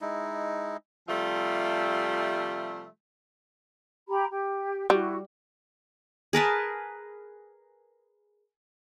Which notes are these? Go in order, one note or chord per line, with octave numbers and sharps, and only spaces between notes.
G#3 D#4 E4
C3 F3 G3 A3 F4 E5
G4 A#5 B5
G4
G3 E4 F#4
G#4 A#4 B4 A5